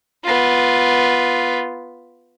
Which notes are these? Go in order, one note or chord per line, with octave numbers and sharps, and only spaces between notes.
B3 F4